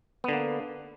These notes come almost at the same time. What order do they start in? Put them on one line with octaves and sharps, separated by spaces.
B3 D3 A#3